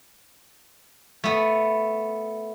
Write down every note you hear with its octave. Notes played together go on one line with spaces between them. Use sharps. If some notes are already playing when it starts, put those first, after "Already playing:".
A3 B3